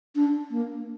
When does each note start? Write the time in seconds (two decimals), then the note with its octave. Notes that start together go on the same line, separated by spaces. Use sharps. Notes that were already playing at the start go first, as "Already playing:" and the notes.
0.16 D4
0.51 A#3